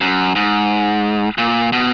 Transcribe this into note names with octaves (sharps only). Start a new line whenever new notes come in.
F#2
G#2
A#2
B2